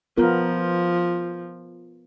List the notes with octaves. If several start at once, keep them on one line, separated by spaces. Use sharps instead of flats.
F3 B3 F4 A#4